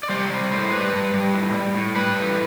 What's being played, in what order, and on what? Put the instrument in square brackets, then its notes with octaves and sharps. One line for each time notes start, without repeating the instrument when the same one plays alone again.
[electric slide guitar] D5
G3 C5
G3
A2
G3 B4
G3
G3
A2
G3
A2
G3 B4
A2